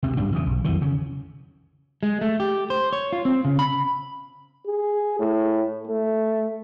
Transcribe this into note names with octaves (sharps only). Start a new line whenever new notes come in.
D2 C3
G2 A#2 G3 D4
E2 C#3 E3
B1
F2 D#3 E3 F#3
C#3
G#3
A3
G4
C5
C#5
F4
C4
C#3
B5
G#4
A2
A3